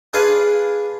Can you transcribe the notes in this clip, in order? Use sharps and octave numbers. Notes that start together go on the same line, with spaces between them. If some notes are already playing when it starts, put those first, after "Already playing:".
D4 F4 G#4 B4 F5 G#5